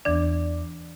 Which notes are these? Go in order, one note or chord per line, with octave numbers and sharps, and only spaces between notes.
E2 E3 D4 D5